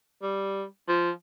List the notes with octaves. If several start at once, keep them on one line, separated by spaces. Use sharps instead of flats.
G3
F3